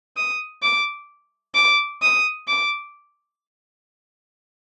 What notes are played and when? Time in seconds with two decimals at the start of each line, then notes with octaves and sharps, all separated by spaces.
0.17 D#6
0.62 D6
1.55 D6
2.02 D#6
2.48 D6